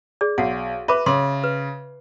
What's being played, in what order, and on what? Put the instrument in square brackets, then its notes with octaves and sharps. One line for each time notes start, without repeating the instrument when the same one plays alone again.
[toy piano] G#4 D5
[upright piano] B1 [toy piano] F#4 F#5
[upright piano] B4 [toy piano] E5 B5 D6
[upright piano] C#3 [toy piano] C6 D6
[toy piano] B4